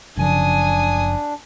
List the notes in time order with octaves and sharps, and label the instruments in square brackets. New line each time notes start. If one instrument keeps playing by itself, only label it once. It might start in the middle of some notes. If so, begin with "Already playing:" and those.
[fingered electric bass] F#1 C#3 F3 [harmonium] D4 [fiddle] G#5 D#6